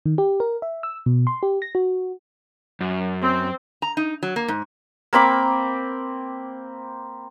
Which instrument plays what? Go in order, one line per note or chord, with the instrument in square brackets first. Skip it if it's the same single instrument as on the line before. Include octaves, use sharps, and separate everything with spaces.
[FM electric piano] D#3
G4
A#4
E5
E6
B2
C6
G4
A#6
F#4
[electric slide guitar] F#2
[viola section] C4
[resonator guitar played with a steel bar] A#5
D#4
F#3
A#3
G#2
[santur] A#3 C4 B5 D6